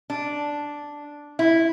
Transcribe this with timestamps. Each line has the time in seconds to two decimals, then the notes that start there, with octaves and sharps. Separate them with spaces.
0.10 D4
1.39 E4